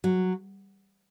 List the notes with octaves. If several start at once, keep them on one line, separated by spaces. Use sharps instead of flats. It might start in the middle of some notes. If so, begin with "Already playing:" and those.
F#3